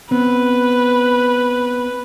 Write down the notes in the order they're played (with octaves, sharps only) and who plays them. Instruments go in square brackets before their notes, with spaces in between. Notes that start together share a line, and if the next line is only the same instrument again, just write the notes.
[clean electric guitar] B3 C4 [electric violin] B4